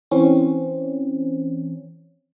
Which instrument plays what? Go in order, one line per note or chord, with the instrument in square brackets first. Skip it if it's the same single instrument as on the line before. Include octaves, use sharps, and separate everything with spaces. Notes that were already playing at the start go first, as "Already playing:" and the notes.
[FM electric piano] E3 C4 C#4